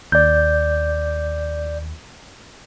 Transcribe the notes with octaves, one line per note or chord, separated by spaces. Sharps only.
D#2 D5 G6